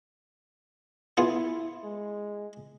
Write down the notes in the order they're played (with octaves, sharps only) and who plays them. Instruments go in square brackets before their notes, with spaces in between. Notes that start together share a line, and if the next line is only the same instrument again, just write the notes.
[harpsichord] B3 F4 G#4 [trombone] E4
[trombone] G#3